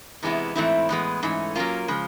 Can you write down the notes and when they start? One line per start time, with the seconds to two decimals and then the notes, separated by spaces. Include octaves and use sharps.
0.23 C3 E3 G#3 B3 E4
0.56 G#2 E3 A3 C4 E4
0.89 A2 E3 G#3 B3
1.23 G#2 E3 A3 C#4
1.56 F#3 A#3 C#4 F4 A#4
1.88 C#3 F3 G#3